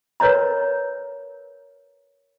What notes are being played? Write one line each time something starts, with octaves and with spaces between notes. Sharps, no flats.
A#4 B4 C#5 D#5 A#5